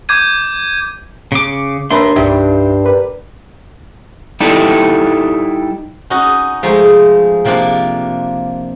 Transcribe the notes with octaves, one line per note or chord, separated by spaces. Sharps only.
D6 G6 G#6 D#7
C#3 D6
D#2 D4 D#4 B4 E5 C6
C2 G2 D#4 G4 E5 G5
A#4 B4 D5
G3 D#4 E4 A4 D5
C#4 D#4 F#4 D#5
F3 G#3 A3 D#4
C3 F3 A#3 D4 F4